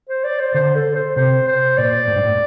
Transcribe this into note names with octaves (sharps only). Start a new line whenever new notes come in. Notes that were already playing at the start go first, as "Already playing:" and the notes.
C5
D5
C5
D3 C5
A4
C5
C3 C5
C5
A#2 D5
A2
G2
A2